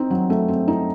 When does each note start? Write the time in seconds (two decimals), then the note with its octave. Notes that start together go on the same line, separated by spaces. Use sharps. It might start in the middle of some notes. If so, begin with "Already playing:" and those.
Already playing: C4 D#4
0.10 F#3
0.30 A3
0.48 C4
0.68 D#4